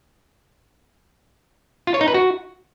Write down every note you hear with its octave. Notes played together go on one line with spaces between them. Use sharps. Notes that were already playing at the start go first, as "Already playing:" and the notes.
F4
C#5
D#4
B4
F#4